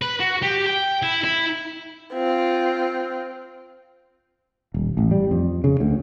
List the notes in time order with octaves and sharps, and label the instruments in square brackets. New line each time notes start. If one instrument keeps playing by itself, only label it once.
[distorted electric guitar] B4
F#4
G4
G5
E4
E4
[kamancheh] C4 F4
[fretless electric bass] D#1
A1
G3
F2
C#3
D2